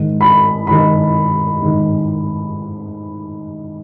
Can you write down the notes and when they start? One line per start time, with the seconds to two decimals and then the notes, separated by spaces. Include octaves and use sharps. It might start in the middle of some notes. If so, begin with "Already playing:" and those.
Already playing: G#2 D#3
0.21 B5
0.67 G#2 D#3 B5
1.62 G#2 D#3